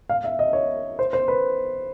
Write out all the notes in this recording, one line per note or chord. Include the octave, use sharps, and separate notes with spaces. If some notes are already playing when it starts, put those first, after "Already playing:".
F5
E5
D#5
C#5
C5
C5
B4